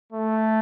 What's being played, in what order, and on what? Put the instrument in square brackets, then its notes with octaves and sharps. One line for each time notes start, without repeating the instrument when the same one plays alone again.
[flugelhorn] A3